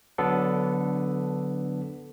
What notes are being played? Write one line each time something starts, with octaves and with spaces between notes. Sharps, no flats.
D3 F#3 B3 D4 A4